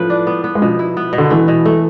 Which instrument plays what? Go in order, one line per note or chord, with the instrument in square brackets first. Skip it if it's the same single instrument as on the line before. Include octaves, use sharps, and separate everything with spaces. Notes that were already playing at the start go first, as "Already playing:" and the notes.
Already playing: [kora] A2 B4 [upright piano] F3
[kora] D4
B3
B3
[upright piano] G#3
[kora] B2 [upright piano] F3
[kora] E4
B3
B2
[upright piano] D3
[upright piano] E3 [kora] A3
[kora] B2
A3